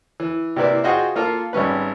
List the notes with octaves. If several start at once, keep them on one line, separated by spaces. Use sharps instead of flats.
E3
C3 A#3 E4 B4 D5
F4 F#4 G#4 C5 D#5 G5
A#3 F4 A4 A#4
G#1 G3 C#4 B4